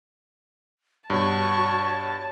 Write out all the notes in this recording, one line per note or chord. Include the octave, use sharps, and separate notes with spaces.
G2 B2 F#4 C#5 A5 C#6